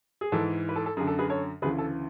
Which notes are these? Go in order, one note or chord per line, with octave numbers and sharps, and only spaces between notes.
G#4
G#2 E3 A4
B4
A4
A4
F#2 D3 G#4
A4
G#4 B4
A4 C#5
D2 C#3 E3 G#4 B4
A4